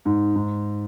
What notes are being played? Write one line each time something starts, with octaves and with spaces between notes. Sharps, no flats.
G#2
G#2